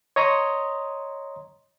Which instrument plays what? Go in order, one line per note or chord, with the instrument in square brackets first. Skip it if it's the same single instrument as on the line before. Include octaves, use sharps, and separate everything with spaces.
[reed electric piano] C#5 D#5 A#5 C6 D#6